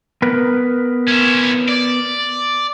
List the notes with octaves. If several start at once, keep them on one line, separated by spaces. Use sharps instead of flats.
B3 A#4 B4
C#4 E4
D5